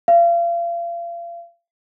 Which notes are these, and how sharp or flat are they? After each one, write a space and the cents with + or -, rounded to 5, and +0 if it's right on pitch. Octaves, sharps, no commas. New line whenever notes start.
F5 -35